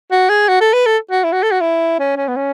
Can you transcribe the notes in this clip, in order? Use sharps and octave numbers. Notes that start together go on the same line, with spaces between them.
F#4
G#4
F#4
A4
B4
A4
F#4
E4
F#4
A4
F#4
E4
C#4
C#4
B3
C#4